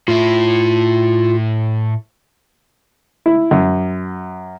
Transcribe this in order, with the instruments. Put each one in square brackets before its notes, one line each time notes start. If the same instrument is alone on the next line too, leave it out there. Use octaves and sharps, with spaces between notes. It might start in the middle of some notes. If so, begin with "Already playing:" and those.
[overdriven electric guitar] A2 E4 [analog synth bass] F4
[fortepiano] E4
F#2